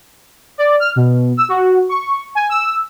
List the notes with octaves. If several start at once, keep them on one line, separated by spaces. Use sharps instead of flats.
D5
F6
B2
E6
F#4
C#6
G#5
E6